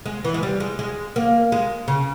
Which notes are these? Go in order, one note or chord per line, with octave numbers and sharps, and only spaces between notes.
G#3
E3
G#3
G3
G#3
G#3
A#3
G#3
C#3